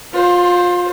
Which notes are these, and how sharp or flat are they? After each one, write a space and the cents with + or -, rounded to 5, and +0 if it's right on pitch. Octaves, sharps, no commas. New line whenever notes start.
F4 +25 C5 +0